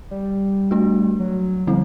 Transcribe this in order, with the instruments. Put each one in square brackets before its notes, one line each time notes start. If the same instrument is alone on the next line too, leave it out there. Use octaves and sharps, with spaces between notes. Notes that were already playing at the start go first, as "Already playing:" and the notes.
[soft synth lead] G3
[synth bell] A3 D4 F#4
[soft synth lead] F#3
[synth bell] D3 G3 C4 E4 [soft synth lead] F3